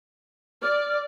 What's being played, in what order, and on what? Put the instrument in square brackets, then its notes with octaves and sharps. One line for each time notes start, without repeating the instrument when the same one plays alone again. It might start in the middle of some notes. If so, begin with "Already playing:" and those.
[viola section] D5 [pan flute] F6